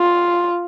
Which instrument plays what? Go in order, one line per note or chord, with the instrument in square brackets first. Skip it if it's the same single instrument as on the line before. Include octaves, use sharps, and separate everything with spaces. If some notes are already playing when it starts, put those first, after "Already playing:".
Already playing: [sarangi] F4